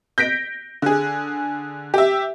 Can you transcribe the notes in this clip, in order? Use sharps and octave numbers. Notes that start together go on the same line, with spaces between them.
G6 A#6 B6 D7
D3 G#4
G4 E5